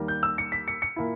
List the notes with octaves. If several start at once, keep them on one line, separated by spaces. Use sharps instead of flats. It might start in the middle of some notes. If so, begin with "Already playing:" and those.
Already playing: D#2 D#3 G3 A#3
G6
E6
C#7
B6
C#7
C#7
A#2 A#3 E4